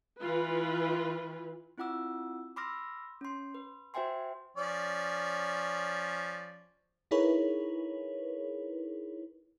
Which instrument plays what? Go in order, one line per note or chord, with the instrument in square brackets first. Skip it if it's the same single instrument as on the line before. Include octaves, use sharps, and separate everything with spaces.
[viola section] E3 F4 B4
[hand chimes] C4 E4 F4 F#5 D6 E6
B5 C6 D6 E6 F6 A#6
C#4 C6
B4
F#4 C5 E5 G5 G#5 C6
[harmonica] F3 C#4 D5
[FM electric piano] D#4 E4 G#4 A#4 B4 C#5